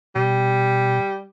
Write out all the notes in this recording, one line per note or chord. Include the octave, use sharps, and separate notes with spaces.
B2 G3